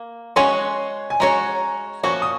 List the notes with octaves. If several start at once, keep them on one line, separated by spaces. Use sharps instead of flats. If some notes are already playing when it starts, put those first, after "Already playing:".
Already playing: A#3
G#3 C#4 F#4 C#5 C6
G#5
G#3 C#4 F#4 C#5 A#5
F3 A#3 C#4 F#4 C#6
D#6